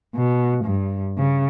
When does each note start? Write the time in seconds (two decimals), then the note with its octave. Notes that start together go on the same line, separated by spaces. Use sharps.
0.15 B2
0.65 G2
1.18 C#3